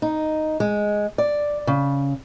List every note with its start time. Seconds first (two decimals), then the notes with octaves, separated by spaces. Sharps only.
0.02 D#4
0.60 G#3
1.18 D5
1.67 C#3